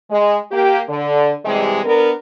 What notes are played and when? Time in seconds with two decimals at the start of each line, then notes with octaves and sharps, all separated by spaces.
0.11 G#3
0.51 A#3 G4
0.88 D3
1.45 C3 E3 G3 G#3
1.85 B3 D4 A#4